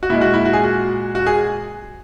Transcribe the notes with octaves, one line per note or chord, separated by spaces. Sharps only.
F#4
A#2 G#3 E4
F#4
E4
F#4
G#4
F#4
F#4
G#4